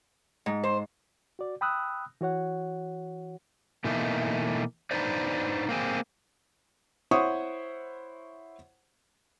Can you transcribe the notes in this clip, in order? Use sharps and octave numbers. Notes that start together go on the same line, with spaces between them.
G#2
C5
F#4 D5
G5 B5 D#6 E6 F#6
E3 F#4 C#5 F#5
B2 E3 A3 A#3 D#4
D4 D#4 B4 C5 D5
A#3 C4 G#4
E4 C5 C#5 F#5 C#6 D#6